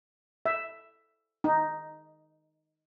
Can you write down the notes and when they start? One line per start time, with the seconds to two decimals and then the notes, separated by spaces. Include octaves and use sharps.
0.46 E5
1.44 D#4